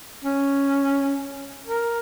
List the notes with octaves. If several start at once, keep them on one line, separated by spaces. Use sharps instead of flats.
C#4
A#4